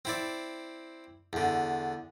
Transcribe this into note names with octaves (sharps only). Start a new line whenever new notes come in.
C4 E4 D5
E2 D3